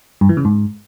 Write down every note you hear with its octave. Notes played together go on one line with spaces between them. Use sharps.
G2
E3
C#3
G#2